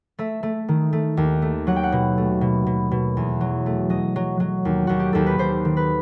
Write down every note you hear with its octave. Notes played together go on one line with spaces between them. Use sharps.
A3 E5
A3
D#3
A3
D#2
A3
F#3 F#5
G5
F#5
B2
A3
B2
B2
B2
E2
F#3
A3
F#3 D#5
F#3
F#3
D#2
D#2 F#4
G4
D#2 A4
B4
D#2 C5
D#3
B4